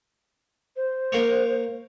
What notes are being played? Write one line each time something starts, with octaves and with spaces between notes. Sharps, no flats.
C5
A#3 C#5